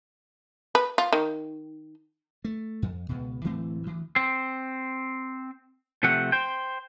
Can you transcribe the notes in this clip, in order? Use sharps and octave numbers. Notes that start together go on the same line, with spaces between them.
B4
F4
D#3
A3
F2
C#2 B2
D1 E3 A3 C4
D2 E3
C4
C3 F3 A3 C4 F#5
C5 G5